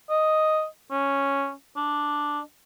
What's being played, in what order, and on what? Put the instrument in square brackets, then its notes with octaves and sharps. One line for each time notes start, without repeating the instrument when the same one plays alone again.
[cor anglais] D#5
C#4
D4